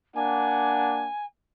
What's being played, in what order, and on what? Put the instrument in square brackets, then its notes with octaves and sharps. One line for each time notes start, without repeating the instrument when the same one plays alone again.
[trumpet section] A#3 D4 F#5 [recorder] G#5